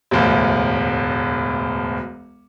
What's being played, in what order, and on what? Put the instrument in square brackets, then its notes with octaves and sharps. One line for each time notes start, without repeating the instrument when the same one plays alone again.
[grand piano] E1 A1 D2